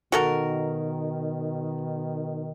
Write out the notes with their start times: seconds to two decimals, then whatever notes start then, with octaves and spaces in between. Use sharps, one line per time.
0.12 B2 D#3 F#4 A4 A#4